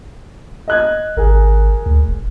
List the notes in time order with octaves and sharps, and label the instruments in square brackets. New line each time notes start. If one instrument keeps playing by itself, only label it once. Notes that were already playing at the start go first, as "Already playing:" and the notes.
[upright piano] D#5 F#6 G#6
[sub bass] G#1 [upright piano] G#4 A#4
[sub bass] D2
E1